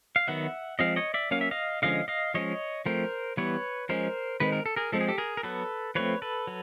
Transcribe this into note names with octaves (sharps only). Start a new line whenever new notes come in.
F5
D#3 F#3 B3 E5 F#5
F3 G#3 C4 D#5 F5
C#5 D#5
D5 E5
F#3 A#3 C#4 F5
E5
D#5 F5
D3 F3 G#3 C#4 D#5 F5
D#5 F5
F3 G#3 C#4 C#5 D#5
F3 A3 C4 A#4 C5
E3 G3 B3 B4 C#5
F3 G#3 C#4 A#4 C5
D#3 G#3 C4 B4
A#4
A4
G#4 A#4
F3 G#3 C4 A4
G#4
G4 A4
G#4 A#4
A#4
F#3 B3 A4 B4
F3 A3 C4 B4 C#5
A4 B4
F#3